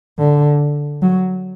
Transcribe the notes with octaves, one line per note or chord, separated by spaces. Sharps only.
D3
F#3